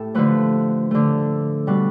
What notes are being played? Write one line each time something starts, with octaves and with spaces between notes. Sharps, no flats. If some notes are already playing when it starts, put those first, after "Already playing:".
Already playing: A2 G4 A4
D3 F3 A3 B4
D3 A3
B2 G3 B4